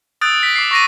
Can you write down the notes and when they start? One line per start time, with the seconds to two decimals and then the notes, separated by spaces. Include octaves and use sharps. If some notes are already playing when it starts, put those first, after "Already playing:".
0.21 D#6 E6 F#6 G6 A6 D7
0.43 B6
0.56 D6 C7
0.71 C#6 A#6 D#7